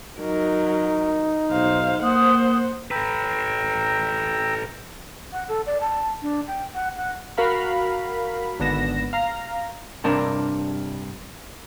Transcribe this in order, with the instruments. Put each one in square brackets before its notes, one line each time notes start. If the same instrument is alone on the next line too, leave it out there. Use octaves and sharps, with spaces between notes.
[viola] F#3 A#4 [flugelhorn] D#4
[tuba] B1 [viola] C5 F5
[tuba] A#3 [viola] C5 F#5 [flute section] D#6
[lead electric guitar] A4 B4 [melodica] G5 A#5 E6
[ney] F#5
A4
D5
A5
D4
G5
F#5
F#5
[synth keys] F#4 A#4 F5 B5
G#1 D3 B3 A#6 E7
F5 A#5
[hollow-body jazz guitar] G2 C3 D4 A#4